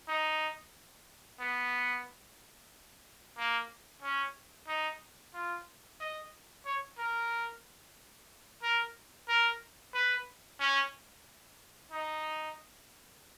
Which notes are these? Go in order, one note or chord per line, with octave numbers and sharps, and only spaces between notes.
D#4
B3
A#3
C#4
D#4
F4
D#5
C#5
A#4
A#4
A#4
B4
C#4
D#4